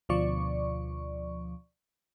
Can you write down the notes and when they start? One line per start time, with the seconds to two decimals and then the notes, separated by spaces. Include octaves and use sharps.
0.09 D2 B2 F3 D5 C#6